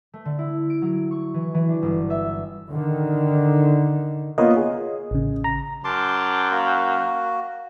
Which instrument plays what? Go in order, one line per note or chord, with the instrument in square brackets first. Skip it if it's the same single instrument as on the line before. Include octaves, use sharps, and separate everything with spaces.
[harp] A3
D3
E4
D7
F#3
C#6
E3
E3
D4
G1
E5
[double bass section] D3 D#3
[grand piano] A#3 B3 F4 [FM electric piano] C#5 D#5
[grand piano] G#4
[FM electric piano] A1 C#3
A#5
[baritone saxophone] F#2 [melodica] A5 C6 D6
[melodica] A#3 F#4